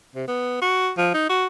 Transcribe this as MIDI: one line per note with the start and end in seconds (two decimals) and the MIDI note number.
0.16 0.27 48
0.28 0.60 59
0.62 0.91 66
0.98 1.09 53
1.14 1.28 63
1.29 1.46 66